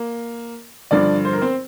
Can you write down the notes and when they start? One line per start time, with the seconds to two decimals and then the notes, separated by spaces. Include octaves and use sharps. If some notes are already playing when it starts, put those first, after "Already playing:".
Already playing: A#3
0.91 G2 D3 F3 D4 D5
1.25 C5
1.33 A#4
1.42 C4 C5